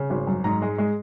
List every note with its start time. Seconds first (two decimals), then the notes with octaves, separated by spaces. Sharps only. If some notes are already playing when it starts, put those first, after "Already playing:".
Already playing: C#3
0.10 G#1
0.27 F#2
0.44 G#2 A#5
0.62 G#3
0.78 G#3